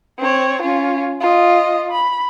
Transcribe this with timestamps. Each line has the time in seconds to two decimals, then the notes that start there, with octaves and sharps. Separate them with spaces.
0.19 C4 C#5
0.63 C#4 F4
1.21 F4 D#5
1.92 B5